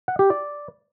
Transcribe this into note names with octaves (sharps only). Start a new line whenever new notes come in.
F#5
G4
D5